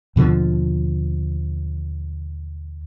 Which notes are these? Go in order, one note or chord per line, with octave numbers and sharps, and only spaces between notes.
D#2 B2 D3 F3